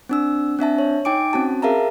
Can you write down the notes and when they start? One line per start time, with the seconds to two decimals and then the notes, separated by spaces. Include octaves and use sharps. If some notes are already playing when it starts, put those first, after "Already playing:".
0.09 C4 D4 E6
0.59 C4 D4 E5 A5
0.78 C#5
1.05 D#4 G5 G#5 D6 D7
1.33 C4 C#4 F#4 A5
1.62 G#4 A#4 E5 F5 A5 A#5